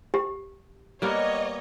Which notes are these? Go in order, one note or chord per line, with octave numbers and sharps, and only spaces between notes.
G4
G3 A#3 B3 C#5 D#5